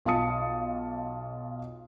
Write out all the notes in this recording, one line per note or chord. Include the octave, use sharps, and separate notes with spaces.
B1 F4 F5 A5 D#6 C#7